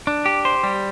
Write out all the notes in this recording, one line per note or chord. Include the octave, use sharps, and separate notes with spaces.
D4
G4
C5
G3